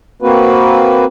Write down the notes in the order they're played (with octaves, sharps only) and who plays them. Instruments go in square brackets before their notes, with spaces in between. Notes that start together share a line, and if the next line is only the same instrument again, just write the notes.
[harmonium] A#3 C4 F#4 B4